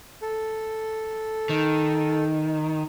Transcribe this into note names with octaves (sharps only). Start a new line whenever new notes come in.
A4
D#3